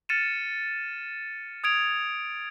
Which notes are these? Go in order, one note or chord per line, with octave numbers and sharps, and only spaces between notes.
F6 A6 C#7 D#7 E7
D#6 G#6 D7 F7